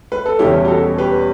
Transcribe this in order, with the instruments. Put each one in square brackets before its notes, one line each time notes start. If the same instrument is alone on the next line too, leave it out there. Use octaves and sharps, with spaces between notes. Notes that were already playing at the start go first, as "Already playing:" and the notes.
[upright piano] B4
A4
[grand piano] E2 B2 G3 C#4 [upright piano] E4 G4
[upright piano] G4
F#4 A4
G4 B4